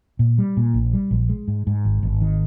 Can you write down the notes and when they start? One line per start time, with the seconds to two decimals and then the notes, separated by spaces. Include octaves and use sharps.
0.19 A#2
0.38 G3
0.57 A#2
0.74 A#1
0.93 G3
1.11 A#1
1.29 G#3
1.48 G#2
1.67 G#2
1.85 G#1
2.03 G#1
2.21 D#3